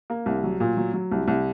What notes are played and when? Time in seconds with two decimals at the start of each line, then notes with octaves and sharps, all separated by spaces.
0.10 A#3
0.26 C2
0.44 F#3
0.60 A#2
0.77 F#3
0.94 F#3
1.11 C2
1.28 C2